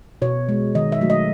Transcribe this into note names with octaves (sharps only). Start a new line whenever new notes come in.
B2 C#5
G#3
D#3 D#5
E5
F#3 A3
D#5